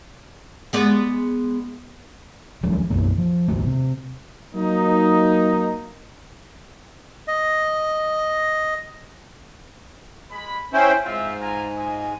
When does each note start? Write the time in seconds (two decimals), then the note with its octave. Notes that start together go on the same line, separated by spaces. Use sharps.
0.73 G#3 B3 D5
2.63 D#2 F3 F#3 G#3
2.90 B1 F#2 E3 A#3
3.18 F3
3.48 G#1 D#2 A3
3.66 C3
4.54 F#3 A#3 D#4
7.28 D#5
10.31 G#3 B5
10.73 C#4 E4 C5 G5
11.04 G#2 C4 F4 E5
11.40 F4 G#5 A#5
11.78 F4 D#5 G#5